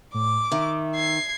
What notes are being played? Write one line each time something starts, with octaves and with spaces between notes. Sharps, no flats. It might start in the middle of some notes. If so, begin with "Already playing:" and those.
A2 D6
D#3 E5
G#6 C7